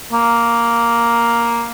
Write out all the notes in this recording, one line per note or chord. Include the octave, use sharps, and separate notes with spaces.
A#3